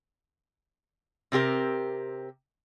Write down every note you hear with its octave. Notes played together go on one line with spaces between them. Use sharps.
C3 C4 G4 A#4